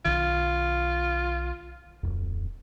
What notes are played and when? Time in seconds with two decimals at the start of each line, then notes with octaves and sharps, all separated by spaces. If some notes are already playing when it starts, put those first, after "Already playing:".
0.05 B1 D#3 F4
2.03 D1 G1 F2